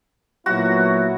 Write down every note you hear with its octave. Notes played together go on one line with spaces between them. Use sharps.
A#2 F#3 B3 E4 F#4